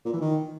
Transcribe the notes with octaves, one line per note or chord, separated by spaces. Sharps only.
A#2
E3
D#3